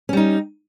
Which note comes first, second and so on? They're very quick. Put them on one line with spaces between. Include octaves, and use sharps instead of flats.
C#4 G3 D#4